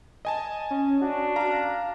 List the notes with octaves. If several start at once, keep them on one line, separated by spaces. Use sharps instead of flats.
D#5 G#5 A5
C#4
D4 F#4
F5 A#5